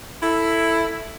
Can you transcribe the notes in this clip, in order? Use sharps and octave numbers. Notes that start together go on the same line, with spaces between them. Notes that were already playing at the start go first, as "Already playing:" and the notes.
E4 A4